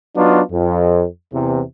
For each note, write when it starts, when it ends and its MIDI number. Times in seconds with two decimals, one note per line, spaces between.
0.16 0.41 54
0.16 0.41 59
0.16 0.41 62
0.16 0.41 63
0.16 0.41 65
0.52 1.05 41
1.33 1.61 40
1.33 1.61 48